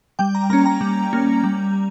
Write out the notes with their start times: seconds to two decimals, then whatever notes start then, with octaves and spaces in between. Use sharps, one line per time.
0.19 G3 G5
0.35 A#5
0.50 A#3 C#4 A#5
0.66 A#5
0.81 G3
1.13 A#3 C#4
1.44 G3